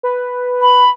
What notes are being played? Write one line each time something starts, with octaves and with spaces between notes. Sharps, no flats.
B4
B5